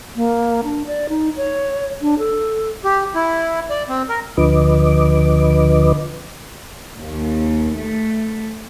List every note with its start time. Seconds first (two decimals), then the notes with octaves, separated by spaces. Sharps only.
0.16 A#3
0.64 D4
0.87 D5
1.09 D#4
1.37 C#5
2.02 D4
2.19 A4
2.84 G4
3.15 E4
3.70 D5
3.89 C4
4.09 A#4
4.37 D2 D3 F3 B4 D#5 D6
7.01 D#2
7.76 A3